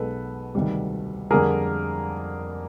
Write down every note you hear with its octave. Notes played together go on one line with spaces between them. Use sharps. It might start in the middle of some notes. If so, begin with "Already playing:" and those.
Already playing: B1 B2 G#3 A4 B4
D2 C3 D#3 G3
F2 D3 G3 A#3 G#4 A#4